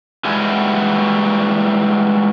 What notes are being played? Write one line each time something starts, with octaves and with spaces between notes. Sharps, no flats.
E3 G3 G#3 E4 F#4 G#5